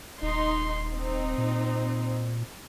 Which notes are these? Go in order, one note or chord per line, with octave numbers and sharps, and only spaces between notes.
D#1 D#4 C6
C4 D#4
A#2